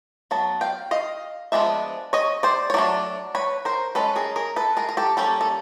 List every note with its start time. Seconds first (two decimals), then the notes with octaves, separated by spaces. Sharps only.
0.31 F#3 B3 A5
0.61 F5 G5
0.91 D#5 F5
1.52 F3 G#3 B3 D4 E5
2.13 C#5 D#5
2.43 C5 D5
2.70 C#5
2.74 F#3 A3 D4 D5
3.35 B4 C#5
3.65 A#4 C5
3.95 G#3 C#4 A4 B4
4.16 G#4 A#4
4.36 G#4 A#4
4.56 A4 B4
4.77 G#4 A#4
4.89 A#4
4.97 G4 A4
5.17 G3 A#3 C#4 G4 A4
5.41 A4